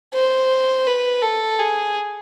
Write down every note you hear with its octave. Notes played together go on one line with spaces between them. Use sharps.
C5
B4
A4
G#4